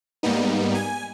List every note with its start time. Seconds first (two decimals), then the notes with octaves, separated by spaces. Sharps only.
0.23 G#2 G3 A#3 B3 D#4
0.75 G#5